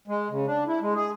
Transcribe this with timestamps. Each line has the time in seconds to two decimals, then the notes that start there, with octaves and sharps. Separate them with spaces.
0.08 G#3
0.30 C#3
0.47 D4
0.67 E4
0.81 G#3
0.95 G#4